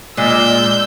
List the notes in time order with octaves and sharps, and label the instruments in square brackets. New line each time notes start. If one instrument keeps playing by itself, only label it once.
[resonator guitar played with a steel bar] A#2 G#3 D5 [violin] E6 G6